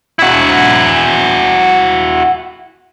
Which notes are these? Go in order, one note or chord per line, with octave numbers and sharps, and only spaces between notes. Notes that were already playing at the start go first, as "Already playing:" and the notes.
E4 F#4